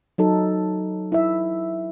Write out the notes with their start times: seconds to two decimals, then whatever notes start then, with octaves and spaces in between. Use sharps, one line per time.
0.18 F#3 D#4 A4
1.12 E4 E5